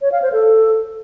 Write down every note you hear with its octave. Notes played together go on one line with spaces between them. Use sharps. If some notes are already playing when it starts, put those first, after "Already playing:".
C#5
F5
C5
A4